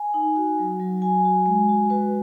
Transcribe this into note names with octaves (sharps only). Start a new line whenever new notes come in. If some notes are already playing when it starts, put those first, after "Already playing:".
Already playing: G#5
D#4
F#4
F#3
F#3
F#4 G#5
F#4
G#3
F#4
F#4 B4